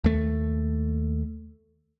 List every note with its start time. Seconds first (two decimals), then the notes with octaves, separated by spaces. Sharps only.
0.04 D#2 A3